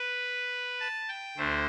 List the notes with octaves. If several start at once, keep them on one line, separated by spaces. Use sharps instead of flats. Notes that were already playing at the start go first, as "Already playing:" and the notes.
Already playing: B4
A5
G5
D2 D3 A3 C5